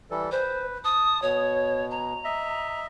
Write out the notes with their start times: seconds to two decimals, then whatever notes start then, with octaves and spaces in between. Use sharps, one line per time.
0.11 E3 G3 A4
0.31 B4 C5
0.84 A5 D#6
1.22 B2 C#5
1.91 A#5
2.24 D#5 E5